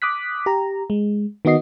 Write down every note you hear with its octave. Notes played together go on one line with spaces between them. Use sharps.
D6 D#6 F#6 B6
G4 A#5
G#3
D#3 B3 F#4 D#5 C7